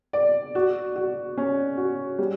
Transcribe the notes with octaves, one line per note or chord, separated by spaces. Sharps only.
D5
F#4
F#4
C#4
F#4
G3